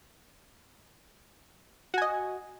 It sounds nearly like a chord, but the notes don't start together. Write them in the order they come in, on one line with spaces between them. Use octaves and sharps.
F#4 G#5 D#5